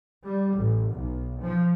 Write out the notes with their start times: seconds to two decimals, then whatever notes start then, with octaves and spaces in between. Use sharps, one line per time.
0.24 G3
0.57 A1
0.91 B1
1.41 F3